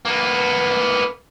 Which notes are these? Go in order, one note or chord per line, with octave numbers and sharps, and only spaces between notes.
A#3 B3